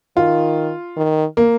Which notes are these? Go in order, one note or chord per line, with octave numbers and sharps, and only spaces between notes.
D#3 F4
D#3
A#3